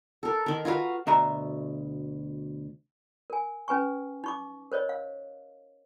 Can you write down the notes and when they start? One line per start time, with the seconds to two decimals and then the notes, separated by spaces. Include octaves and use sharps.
0.23 A4 A#4
0.46 D#3 A#4
0.65 F4 F#4 B4 F5
1.07 D2 B2 E5 A#5
3.30 A#4 G#5
3.68 C#4 B4 G#5 C#6
4.24 D#4 C#6 D6
4.72 A#4 C5 C#5 D#5
4.89 F5